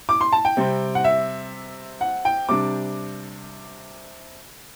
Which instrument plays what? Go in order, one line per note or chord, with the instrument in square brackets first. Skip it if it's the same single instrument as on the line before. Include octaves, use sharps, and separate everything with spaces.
[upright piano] D6
C6
A5
G5
C3 G3 C4
F#5
E5
F#5
G5
C3 G3 D4 D6